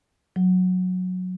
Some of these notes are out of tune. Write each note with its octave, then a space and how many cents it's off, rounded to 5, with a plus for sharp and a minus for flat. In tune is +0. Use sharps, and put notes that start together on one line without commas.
F#3 -15